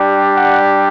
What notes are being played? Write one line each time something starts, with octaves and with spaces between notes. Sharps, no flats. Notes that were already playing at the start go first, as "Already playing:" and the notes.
Already playing: G3 D4 G4
F#5